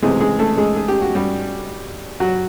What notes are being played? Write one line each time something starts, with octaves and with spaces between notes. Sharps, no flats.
C#2 C3 E3 G#3 A3 C4 G#4
G#3 G#4
A3 A4
G#3 G#4
G#4
G4
F#4
G3 G4
F#3 F#4